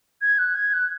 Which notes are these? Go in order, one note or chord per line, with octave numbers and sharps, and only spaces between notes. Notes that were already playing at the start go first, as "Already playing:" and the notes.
G#6
F#6
G#6
F#6